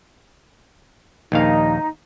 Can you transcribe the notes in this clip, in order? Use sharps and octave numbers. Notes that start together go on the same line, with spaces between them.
A#1 D#2 D#4 F5